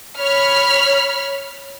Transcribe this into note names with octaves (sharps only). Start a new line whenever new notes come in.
C#5 B5 F6